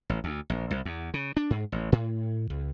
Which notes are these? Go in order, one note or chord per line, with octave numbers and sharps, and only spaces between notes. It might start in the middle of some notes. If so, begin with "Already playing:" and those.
A1
D2
A#1
C2
E2
C#3
D4
G#2
A1
A2
C#2